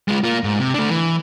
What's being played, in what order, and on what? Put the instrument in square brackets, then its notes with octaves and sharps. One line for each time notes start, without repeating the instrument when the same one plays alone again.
[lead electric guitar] G#3 F4
A#3 F4
G#2
C3
A3 D4
E3